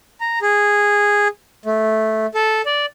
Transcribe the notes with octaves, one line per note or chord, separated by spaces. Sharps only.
A#5
G#4
A3
A4
D5